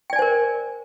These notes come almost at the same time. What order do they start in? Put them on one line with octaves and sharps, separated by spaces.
G5 D5 G#5 C5 A#4